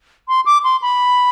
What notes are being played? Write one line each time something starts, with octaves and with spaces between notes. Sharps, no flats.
C6
D6
C6
B5